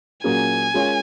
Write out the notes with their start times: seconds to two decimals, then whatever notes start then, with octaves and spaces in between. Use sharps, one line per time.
0.24 A#2 F#3 A#3 C#4 G#4 G#5
0.74 G#3 C#4 F4 A#4 C#5